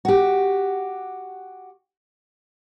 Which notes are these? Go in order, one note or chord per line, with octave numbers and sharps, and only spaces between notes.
F#4 G4